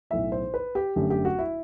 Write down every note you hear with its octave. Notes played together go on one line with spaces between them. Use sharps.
B1 A2 E3 E5
C5
B4
G4
G1 F#2 D3 A3 G4
G4
F#4
E4